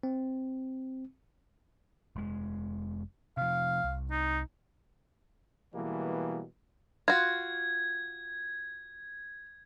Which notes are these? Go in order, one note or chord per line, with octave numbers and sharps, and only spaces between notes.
C4
F1 G#3
C3 F3 F5
C2
D#4
B2 E3 G3 G#3 A#3
F4 F#4 G#6